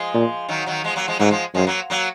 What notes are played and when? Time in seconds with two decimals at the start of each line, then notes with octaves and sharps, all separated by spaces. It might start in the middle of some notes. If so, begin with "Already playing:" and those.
Already playing: F3 G#3
0.14 A#2
0.49 D#3 F#3
0.66 D#3 F#3
0.84 F3 G#3
0.96 F#3 A#3
1.08 F3 G#3
1.19 G#2 F#3 A#3
1.31 F3 G#3
1.54 F#2 F3 G#3
1.67 F#3 A#3
1.90 F#3 A#3